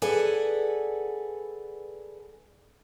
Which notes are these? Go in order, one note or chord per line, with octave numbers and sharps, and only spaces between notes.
G#4 A4 B4 D5 F#5 G#5